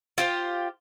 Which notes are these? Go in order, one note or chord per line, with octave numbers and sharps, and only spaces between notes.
F4 G4 C5